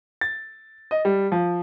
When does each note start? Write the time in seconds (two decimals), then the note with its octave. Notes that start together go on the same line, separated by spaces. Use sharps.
0.21 A6
0.91 D#5
1.05 G3
1.32 F3